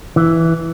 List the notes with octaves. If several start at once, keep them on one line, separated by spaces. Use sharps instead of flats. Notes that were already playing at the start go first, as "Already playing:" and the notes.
E3